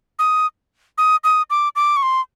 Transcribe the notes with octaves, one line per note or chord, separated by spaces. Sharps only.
D#6
D#6
D#6
D6
D6
C#6
C6